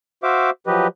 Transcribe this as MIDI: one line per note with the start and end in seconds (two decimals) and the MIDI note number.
0.23 0.50 66
0.23 0.50 72
0.23 0.50 76
0.23 0.50 77
0.23 0.50 86
0.67 0.87 53
0.67 0.87 54
0.67 0.87 67
0.67 0.87 71
0.67 0.87 75